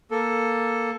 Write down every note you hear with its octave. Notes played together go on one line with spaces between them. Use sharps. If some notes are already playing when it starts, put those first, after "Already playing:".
A#3 A4